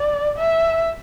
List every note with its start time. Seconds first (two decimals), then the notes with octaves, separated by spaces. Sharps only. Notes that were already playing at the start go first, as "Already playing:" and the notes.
Already playing: D5
0.38 E5